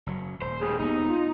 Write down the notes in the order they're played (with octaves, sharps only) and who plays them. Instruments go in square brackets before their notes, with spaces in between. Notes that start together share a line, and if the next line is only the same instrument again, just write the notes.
[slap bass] F#1 F#3
[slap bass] D#1 [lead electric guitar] C5
[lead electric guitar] A2 G3 [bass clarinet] G#4
[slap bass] E1 B3 [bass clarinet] D#2 [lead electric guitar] D#4
[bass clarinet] F4